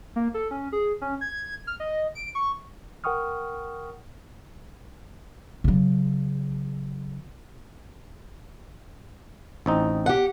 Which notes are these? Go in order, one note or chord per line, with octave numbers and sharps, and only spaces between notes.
A#3
A4
C#4
G#4
C#4
G#6
F6
D#5
D7
C#6
A#4 F#5 G5 C#6 D#6 F6
C#3 F#3
A1 C4 D#4
G4 F#5